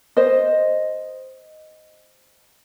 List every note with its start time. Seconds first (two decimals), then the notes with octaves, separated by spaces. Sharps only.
0.17 C5 D#5